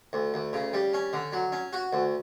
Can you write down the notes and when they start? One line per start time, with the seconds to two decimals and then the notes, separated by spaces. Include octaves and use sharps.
0.13 D2
0.34 D2
0.53 C#3
0.73 G3
0.93 C#4
1.13 D3
1.33 F#3
1.52 C#4
1.73 F#4
1.93 D2